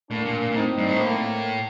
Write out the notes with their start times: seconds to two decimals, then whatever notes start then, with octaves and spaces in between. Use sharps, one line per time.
0.11 A2 A#3 D4
0.26 A#2
0.41 A#2
0.51 A#2
0.55 A2 C4 D#4
0.78 G2
0.88 A2
1.00 A#3